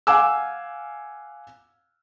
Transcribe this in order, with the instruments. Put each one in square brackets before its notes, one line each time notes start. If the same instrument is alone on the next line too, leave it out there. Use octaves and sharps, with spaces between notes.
[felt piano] F5 F#5 G#5 D6 E6